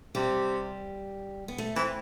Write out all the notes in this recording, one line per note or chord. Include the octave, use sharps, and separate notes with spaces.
C3 G3
B3
A3
E3 C4